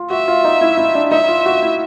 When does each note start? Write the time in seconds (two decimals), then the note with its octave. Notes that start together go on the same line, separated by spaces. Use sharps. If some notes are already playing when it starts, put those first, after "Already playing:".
Already playing: F4
0.10 F#4 E5
0.28 F4
0.44 D#4
0.61 E4
0.77 E4
0.95 D4
1.11 D#4 E5
1.28 F4
1.46 F#4
1.62 E4